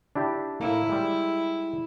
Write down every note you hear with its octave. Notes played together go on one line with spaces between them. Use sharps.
D4 E4 G4
A2 A#3 E4
G3 G#3